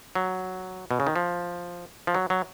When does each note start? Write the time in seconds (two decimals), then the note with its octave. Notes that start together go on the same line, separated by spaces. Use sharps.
0.15 F#3
0.91 B2
1.00 C#3
1.07 D#3
1.16 F3
2.07 F3
2.15 F#3
2.30 F#3